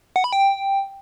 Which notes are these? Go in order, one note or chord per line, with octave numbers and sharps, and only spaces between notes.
F#5
B5
G5